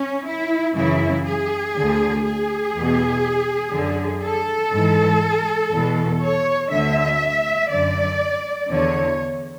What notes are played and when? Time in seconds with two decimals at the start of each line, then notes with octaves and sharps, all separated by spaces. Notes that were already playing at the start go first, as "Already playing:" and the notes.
Already playing: C#4
0.27 E4
0.77 F#2 C#3 E3 E4
1.26 G#4
1.75 D2 D3
2.25 G#4
2.74 E2 B2
3.74 F#2 D3
4.24 A4
4.73 G#2 E3
5.72 E2 B2
6.22 C#5
6.71 D2 D3 E5
7.70 F#2 D3 D5
8.69 E2 D3 C#5